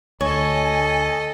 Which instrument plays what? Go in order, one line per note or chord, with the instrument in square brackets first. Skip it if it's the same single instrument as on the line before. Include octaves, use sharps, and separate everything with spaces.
[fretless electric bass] D2 [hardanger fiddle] A4 D#5 [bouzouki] C#5 [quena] G#5